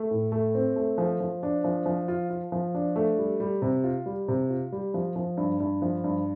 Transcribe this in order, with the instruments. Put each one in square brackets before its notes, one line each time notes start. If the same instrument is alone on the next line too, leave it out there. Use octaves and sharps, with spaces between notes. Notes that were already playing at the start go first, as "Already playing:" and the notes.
Already playing: [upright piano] A3
A2
A3
C4
A3
F3
F3
D4
F3
F3
F4
F4
F3
D4
A3
G3
G3
C3
F4
G3
C3
F4
G3
F3
F3
G2
G2
F3
G2